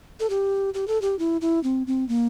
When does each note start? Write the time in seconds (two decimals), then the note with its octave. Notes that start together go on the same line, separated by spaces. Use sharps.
0.20 A4
0.30 G4
0.74 G4
0.88 A4
1.02 G4
1.19 E4
1.41 E4
1.64 C4
1.87 C4
2.09 A#3